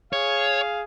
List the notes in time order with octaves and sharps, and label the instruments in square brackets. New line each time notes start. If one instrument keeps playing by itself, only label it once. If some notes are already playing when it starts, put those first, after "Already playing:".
[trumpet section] G#4 F5 [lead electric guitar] C#5